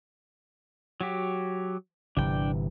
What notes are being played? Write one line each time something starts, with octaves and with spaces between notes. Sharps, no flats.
F#3 F#4 G4
G1 C3 E3 D4 G5